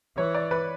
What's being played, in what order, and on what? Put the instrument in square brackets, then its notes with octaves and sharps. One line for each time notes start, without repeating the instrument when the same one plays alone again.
[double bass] E3 [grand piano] C#5
[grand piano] D5
B4